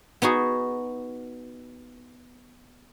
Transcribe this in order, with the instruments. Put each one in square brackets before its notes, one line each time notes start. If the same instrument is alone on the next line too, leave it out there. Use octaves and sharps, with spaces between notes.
[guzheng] B3 D#4 F#4 G#4